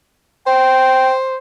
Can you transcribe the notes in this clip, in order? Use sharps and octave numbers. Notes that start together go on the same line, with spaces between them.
C5 G5